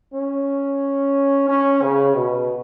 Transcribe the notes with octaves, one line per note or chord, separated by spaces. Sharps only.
C#4
C#4
C#3
B2